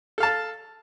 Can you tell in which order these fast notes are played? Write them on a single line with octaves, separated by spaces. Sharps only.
A4 F5 A5